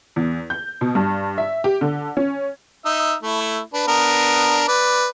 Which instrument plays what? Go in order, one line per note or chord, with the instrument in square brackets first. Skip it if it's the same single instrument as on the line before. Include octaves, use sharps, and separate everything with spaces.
[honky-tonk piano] E2
G6
B2
G2
E5
G4
D3
C#4
[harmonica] D#4 E5
A3 E4
D4 B4
B3 D4 A#4
B4 D5